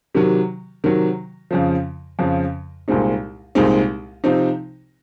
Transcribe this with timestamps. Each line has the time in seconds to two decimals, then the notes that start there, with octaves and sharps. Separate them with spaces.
0.15 C3 D#3 F#3
0.84 C3 D#3 F#3
1.51 F2 C#3 F3
2.19 F2 C#3 F3
2.88 C2 A#2 G#3 C4 D#4
3.55 C2 A#2 G#3 C4 D#4
4.24 C3 F3 C4 D#4